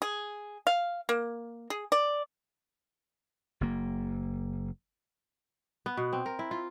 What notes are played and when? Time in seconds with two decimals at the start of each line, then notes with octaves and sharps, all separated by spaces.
0.02 G#4
0.67 F5
1.09 A#3
1.70 G#4
1.92 D5
3.61 F#1 A#3
5.86 B3
5.97 B2
6.13 C4
6.26 A#4
6.39 E4
6.51 F4